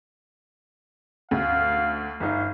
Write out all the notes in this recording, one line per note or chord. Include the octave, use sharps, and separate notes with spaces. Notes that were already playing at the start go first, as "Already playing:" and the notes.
D2 F5
G1 D#4 F5